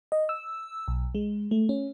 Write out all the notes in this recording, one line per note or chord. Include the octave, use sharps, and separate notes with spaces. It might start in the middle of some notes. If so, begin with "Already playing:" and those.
D#5
E6
B1
G#3
A3
C#4